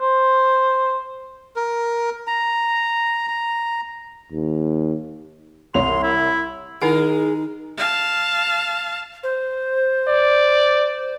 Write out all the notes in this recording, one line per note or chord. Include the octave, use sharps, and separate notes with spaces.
C5
A#4
A#5
A#5
D#2
C2 C#5 C6 F7
E4
D#3 G#3 D#4 E4 G#4 A#4 F#5
F5 A5
C5
D5